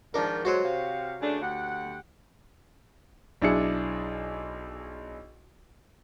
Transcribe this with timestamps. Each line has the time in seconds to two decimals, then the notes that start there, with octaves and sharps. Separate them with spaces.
0.14 G#2 D#3 F3 D4 A#4
0.45 D3 F#3 G#3 F#4 C5 C#5
0.63 C3 F5
1.21 C#3 A3 D4
1.41 D2 G4 F#5
3.42 B1 D4 E4 G#4 C#7